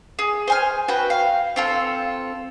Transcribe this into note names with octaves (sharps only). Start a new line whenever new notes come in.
G#4
C5 G#5 F6
F#4 B4 G5
F5
C4 F4 A4